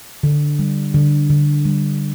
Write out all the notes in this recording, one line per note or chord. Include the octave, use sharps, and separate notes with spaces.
D3
G3
D3
D3
G3